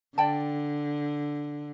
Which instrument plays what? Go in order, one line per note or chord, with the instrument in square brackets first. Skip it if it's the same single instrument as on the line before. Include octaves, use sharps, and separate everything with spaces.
[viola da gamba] D3 [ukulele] D5 G5 A5